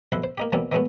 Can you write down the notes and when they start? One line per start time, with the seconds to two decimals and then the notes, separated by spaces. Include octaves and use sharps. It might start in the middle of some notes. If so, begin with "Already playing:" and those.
0.12 B1 F2 E4 F#5 C6
0.24 C5
0.38 A#3 D#4 G4
0.52 B2 E3 F#3 G3 A#3 C4
0.72 D#3 E3 F#3 G#3 A3 B3